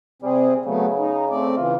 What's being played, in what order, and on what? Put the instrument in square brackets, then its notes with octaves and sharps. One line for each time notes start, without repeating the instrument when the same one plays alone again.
[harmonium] C3 C4 G#4 [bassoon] G3
[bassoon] C#3 [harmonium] F#3 A3 B3
[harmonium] D#4
A3 C4 D5
[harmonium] C#3 E3 [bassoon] F4